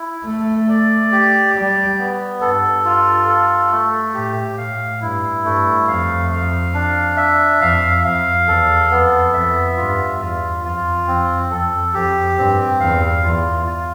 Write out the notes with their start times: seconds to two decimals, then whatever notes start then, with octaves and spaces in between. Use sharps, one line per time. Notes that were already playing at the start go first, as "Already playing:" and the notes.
Already playing: E4
0.24 A3 A4
0.69 D5
1.12 G4
1.54 G3 D5
1.98 B3
2.41 G2 A4
2.85 F4
3.28 A4
3.71 A3
4.14 A2 G4
4.57 A2 F5
5.00 G2 E4
5.44 G2 A3
5.87 F2 F5
6.31 F5
6.74 D4
7.17 E5
7.61 F2 F5
8.03 F2 F5
8.47 E2 A4
8.91 F2 B3
9.33 F2 E5
9.77 G2 F4
10.20 E2 F4
10.64 F2 F4
11.07 F2 C4
11.50 F2 A4
11.94 F2 G4
12.37 G2 C4
12.80 E2 F5
13.23 E2 F4
13.66 F4